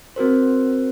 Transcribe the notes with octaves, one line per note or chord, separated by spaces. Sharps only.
C4 F#4 A#4 C5